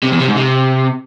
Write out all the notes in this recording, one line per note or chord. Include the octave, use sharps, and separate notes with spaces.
C3
E2
C3
G#2
C3